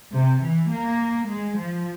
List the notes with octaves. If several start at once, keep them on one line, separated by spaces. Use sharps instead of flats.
C3
E3
A#3
G#3
F3